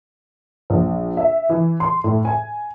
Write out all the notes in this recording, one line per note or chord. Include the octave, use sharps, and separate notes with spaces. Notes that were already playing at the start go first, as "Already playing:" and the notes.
A#1
E5
E3
C6
A2
G#5